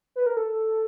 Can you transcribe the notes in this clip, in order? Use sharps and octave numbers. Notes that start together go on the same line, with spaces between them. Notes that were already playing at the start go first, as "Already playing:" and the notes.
B4
A#4
A4